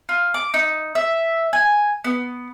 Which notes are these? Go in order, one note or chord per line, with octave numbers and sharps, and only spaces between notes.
F4
D6
D#4
E5
G#5
B3